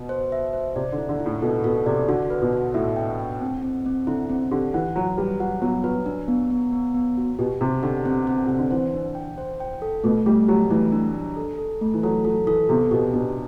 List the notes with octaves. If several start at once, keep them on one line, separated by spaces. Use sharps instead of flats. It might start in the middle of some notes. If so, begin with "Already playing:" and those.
Already playing: B2
C5
E5
C5
C3 D5
D3
E4
D3
E4
A2
B2 A4
B2 A4
C3 D5
D3 F#4
B4
B2
F#4
A2 E5
G5
G5
C4
C4
C4
D3 E4
C4
D3 G4
E3 F#5
F#3 F#4
G3 B4
F#3 F#5
F#3 B3
F#3 B4
D4
B3
B3
B3
B3
F#4
B2 G4
C3 C4
D3 G4
C4
C4
C3 C4
D3
E3 C5
D4
G5
C5
G5
A4
B2 A3
G3 A3
F#3 G4
E3 A3
D4
D4
A4
A4
A3
E3
F#3 A4
F#3 A4
E3 A4
C3 B3
B2 G4
B2 D4